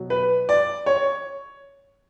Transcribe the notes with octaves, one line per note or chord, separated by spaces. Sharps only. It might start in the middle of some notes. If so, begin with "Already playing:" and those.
Already playing: B2 F#3
B4
D5
C#5